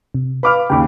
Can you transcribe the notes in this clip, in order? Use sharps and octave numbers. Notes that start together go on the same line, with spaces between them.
C3
B4 F5 B5 D6 F6
D#2 C#3 G5 B5 D6